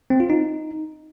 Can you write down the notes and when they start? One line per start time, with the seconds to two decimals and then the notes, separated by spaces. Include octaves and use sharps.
0.10 C4
0.20 F4
0.30 D#4